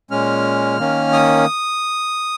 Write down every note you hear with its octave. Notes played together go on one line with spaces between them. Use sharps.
A#2 G#3 C#4 F6
D#3 A#3 C#4
D#6